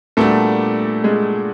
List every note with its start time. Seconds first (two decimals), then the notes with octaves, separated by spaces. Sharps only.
0.17 A#2 G3 A3 B3 D4 F#4
1.04 G#3